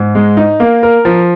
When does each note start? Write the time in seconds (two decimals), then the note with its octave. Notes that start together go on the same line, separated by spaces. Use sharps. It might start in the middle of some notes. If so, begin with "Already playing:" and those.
Already playing: G#2
0.15 G#3
0.37 D#4
0.60 A#3
0.83 A#4
1.05 F3